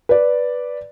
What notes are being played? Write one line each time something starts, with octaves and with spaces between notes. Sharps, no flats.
B4 D5